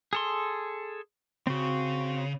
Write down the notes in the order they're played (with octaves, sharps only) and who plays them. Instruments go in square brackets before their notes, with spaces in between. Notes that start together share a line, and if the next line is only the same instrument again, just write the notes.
[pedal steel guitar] G#4 A4 C6
[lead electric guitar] C#3 [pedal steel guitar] C4 F#4